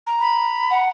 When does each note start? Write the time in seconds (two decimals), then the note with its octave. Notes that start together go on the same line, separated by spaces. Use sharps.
0.07 A#5
0.19 B5
0.70 F#5